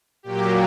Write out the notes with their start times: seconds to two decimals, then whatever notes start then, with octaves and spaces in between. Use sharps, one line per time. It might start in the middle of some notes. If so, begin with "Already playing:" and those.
0.23 A#2 F#3 A#3 G4